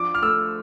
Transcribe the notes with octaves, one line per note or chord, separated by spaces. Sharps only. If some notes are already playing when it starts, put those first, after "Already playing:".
Already playing: F3 D4 D6
F6
A3 E6